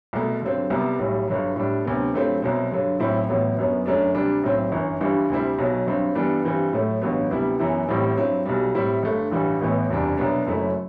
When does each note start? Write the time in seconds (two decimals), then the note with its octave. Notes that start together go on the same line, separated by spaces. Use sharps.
0.13 C2 B2 A3
0.41 G2 D3 F#3 C4
0.70 C2 C3 G3 B3
0.99 B1 A2 G3
1.28 G1 G2 D3 F#3
1.56 A2 G3 D4
1.85 D2 C3 F#3 B3
2.14 G2 F#3 A3 C4 E4
2.42 C2 B2 F#3 C4
2.71 G2 D3 F#3
3.00 B1 A2 F#3 C4 E4
3.29 A1 A2 F#3 B3
3.57 G1 F#2 F#3 B3
3.86 G1 F#2 F#3 A3 D4
4.15 D2 C3 G3 D4
4.44 B1 A2 F#3 C4
4.72 G1 F#2 E3
5.01 G1 G2 E3 G3
5.30 D2 C3 G3 C4 E4
5.58 B1 B2 F#3
5.87 G1 G2 F#3 C4
6.15 G2 E3 G3 B3 D4
6.44 G2 E3 G3 C4
6.73 A2 F#3 A3
7.02 A1 G2 F#3 B3
7.30 D2 C3 G3 B3 E4
7.59 F#2 E3 B3 E4
7.88 A1 A2 G3 C4 E4
8.17 G2 F#3 C4 E4
8.45 B1 B2 G3
8.74 A2 G3 C4 E4
9.03 G1 G2 D3 A3
9.31 A1 G2 E3 G3
9.61 A1 A2 E3 B3 E4
9.89 F#1 E2 C3 G3 D4
10.18 C2 B2 F#3 B3 D4
10.46 F#1 F#2 F#3 A3 E4